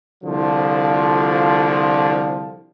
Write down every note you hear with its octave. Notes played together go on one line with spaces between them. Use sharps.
C2 D3 F3